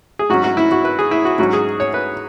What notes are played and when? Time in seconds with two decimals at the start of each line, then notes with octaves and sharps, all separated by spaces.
0.19 G#4
0.29 G#2 F#3 C#4 F#4
0.44 F#4
0.57 E4
0.71 F#4
0.85 B4
0.99 G#4
1.11 E4
1.25 F#4
1.39 G#2 F#3 C#4 F#4
1.53 G#4
1.80 C#5
1.94 B4